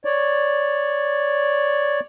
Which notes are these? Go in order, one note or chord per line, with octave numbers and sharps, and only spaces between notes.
C#5 D5